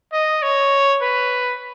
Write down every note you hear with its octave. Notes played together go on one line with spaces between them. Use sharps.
D#5
C#5
B4